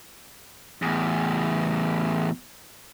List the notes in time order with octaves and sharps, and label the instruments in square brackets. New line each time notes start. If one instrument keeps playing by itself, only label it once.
[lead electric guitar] E2 A2